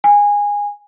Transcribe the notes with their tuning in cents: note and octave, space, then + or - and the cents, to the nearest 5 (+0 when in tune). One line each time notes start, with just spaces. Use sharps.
G#5 -15